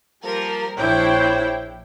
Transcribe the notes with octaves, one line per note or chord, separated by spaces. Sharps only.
F3 G3 A#3 A#4
A#1 D4 E4 C5 C#5 G5